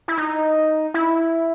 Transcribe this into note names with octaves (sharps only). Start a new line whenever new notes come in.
E4
D#4
E4